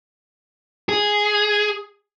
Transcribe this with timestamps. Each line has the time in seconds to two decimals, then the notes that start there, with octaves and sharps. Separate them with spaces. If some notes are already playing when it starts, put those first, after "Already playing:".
0.89 G#4